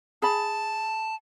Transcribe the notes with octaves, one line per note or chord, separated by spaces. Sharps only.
G#4 A5 B5